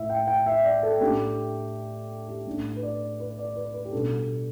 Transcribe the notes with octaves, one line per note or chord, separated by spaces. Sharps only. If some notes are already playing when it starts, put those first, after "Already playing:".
Already playing: A2 A3 E4 E5
G5
G5
E5
D5
A4
A2 A3 D4 G4
G4
A2 A3 D4
B4
D5
B4
D5
B4
B4
G4
B2 G3 D4 A4